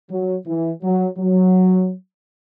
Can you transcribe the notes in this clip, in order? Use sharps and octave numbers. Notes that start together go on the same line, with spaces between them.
F#3
E3
F#3
F#3